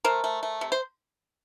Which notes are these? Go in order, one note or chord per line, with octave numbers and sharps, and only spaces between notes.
A3 A#4 C5
A3
A3
C3
C5